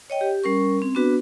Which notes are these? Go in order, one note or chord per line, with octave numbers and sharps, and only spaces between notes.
C#5 D#5 G5
G4
G3 C#4 A#4 C#6
C4
B3 D4 F#4 B4